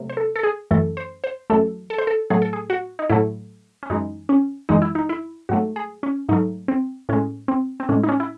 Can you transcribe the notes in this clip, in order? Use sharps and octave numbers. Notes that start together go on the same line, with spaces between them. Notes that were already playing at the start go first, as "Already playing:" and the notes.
Already playing: C3 F#3 A3
C5
A4
A4
G#4
F#2 E3 A3 A4
C5
C5
F#2 E3 A3 A4
A4
C5
A4
A2 F#3 A3 G#4
A4
G#4
F#4
D#4
A2 F#3 A3 E4
C#4
F#2 E3 G#3 D#4
C#4
F#2 E3 G#3 D#4
E4
D#4
E4
G#2 F#3 A3 F#4
G#4
C#4
G#2 F#3 A3 D#4
C4
A2 G#3 C#4
C4
C4
A2 G#3 C#4
D#4
C#4
E4